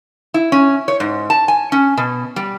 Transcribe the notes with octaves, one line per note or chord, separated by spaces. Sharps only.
E4
C#4
C#5
G#2
A5
G#5
C#4
B2
G3